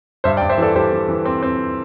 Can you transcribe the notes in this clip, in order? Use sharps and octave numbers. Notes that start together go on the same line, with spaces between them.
G2 C5 E5
D5 G5
G2
C5 E5
E3 A4 D5
G2 G4 C5
E3
E3
C4
C4